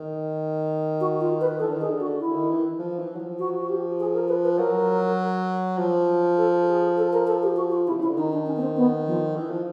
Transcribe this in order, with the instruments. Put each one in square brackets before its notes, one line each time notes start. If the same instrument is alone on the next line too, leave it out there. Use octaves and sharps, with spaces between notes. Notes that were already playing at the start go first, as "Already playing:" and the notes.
Already playing: [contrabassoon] D#3
[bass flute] F#4
F4
B4
[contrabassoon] E3 [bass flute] A4
[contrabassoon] D3
D#3
[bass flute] G#4
[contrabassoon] D3
[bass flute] F#4
[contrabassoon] D3
[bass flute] E4
[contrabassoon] D3
D#3
E3
F3
E3
F#3
F3
[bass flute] F#4
F#4
G4
G#4
A#4
B4
B4
[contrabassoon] F#3 [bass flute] A#4
[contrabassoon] F3
[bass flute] A4
G#4
A4
A#4
A4
G4
F#4
F4
E4
[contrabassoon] C3
[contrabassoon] C#3 [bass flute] E4
[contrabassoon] D3
[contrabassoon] D#3 [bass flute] D#4
[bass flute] D4
C#4
B3
C4
B3
F3
[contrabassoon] E3
F3